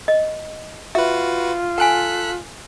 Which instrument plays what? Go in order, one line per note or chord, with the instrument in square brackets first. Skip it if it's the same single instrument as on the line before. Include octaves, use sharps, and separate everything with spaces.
[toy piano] D#5
[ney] F4 [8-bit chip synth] F#4 B4 [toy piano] E5
[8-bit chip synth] A4 F#6 B6 [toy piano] F#5 G#5